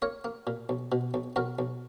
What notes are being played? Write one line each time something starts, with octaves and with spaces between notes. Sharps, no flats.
A#3 A#4 C#5
A#3
A#2
B1
B2
B1
B1 F#4 A#4
B1